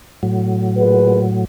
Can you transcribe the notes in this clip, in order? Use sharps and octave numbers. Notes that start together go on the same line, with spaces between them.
A2 F#3
A#2 G#4 B4